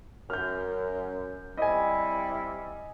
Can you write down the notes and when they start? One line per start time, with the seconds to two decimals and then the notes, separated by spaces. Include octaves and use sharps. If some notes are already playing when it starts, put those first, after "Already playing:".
0.30 F#2 F6 G6
1.57 G3 C4 E4 D#5 G#5